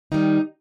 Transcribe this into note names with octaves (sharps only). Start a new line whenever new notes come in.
D#3 G3 D#4